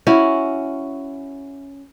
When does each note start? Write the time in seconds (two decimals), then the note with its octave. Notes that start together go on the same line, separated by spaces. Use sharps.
0.07 C#4 E4 F#4